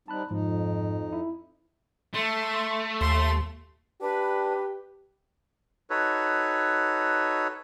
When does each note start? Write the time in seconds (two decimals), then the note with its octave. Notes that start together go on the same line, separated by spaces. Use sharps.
0.08 G3 C4 D#4 A5 B5 F#6
0.31 F2 G#2 F3 D#4
1.13 E4
2.14 A3 C6
3.01 D#2 C6
4.01 D4 G4 B4
5.90 D#4 F#4 A4 B4 C#5